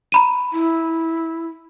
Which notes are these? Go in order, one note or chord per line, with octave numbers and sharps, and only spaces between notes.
A#5 B5 D#7
E4